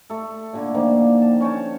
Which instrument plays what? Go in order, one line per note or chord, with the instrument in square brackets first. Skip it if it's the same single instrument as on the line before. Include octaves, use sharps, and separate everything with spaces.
[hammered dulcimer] A3 A4
A#2 D3 E4
D3 D#3 F3 A#3
A5
C#4 C#5 G5 A5